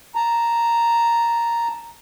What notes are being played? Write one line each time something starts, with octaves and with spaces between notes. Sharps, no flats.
A5 A#5